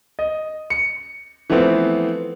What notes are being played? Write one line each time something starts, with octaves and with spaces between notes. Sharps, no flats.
D#5
C#7
E3 F3 A3 B3 C4